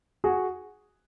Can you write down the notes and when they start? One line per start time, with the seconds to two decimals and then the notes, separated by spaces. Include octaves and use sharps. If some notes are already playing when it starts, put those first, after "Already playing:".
0.24 F#4 G#4